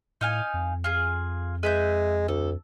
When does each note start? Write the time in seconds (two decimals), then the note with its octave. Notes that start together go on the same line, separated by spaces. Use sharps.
0.21 A2 D#4 F5 G#5
0.54 F2
0.84 F4 G#4
1.63 G#3 B4 E5 G6
2.28 D2 A4